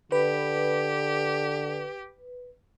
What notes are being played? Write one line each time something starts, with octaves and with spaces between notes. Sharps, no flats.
D3 G4 B4